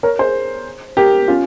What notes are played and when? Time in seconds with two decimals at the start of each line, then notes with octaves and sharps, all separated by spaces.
0.03 A#4 C#5
0.19 G#4 C5
0.97 G4 A#4
1.28 C#4 F4